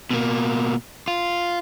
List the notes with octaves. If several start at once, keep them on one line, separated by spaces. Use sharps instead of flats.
B2 A#3
F4